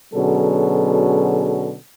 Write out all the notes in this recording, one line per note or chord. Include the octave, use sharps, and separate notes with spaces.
B2 D3 F#3 C#4 G#4 A4